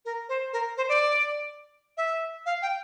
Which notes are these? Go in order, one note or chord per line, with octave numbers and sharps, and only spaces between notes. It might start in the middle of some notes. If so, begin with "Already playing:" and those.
A#4
C5
A#4
C5
D5
E5
F5
G5